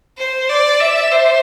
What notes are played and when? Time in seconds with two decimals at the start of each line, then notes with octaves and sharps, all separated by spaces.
0.18 C5
0.49 D5
0.80 E5
1.11 C5